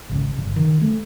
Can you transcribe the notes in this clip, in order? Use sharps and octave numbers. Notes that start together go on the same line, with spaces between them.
G#1 C#2
G1
D#3
A3